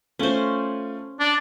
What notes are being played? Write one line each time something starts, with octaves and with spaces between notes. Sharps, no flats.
A3 C#4 F4 C5
D4